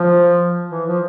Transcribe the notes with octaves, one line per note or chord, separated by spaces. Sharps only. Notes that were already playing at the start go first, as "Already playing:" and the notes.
Already playing: F3
E3
F3